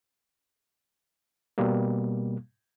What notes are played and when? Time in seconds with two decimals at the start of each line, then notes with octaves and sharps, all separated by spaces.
1.58 B2 G3 A#3